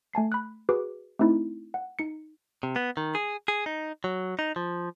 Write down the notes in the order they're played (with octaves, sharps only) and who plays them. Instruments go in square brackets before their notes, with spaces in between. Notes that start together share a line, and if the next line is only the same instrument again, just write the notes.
[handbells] A3 G#5 A5 C7
B5 F#6
F#4 G#4 B4 D6
A3 C4 D#4 E4
F#5
D#4 C#7
[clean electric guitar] C3
B3
D#3
G#4
G#4
D#4
F#3
D#4
F3